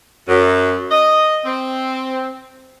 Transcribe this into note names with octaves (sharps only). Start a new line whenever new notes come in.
F#2
D#5
C4